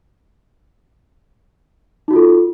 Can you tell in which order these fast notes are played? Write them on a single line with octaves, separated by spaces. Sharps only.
D#4 F#4 F4 A4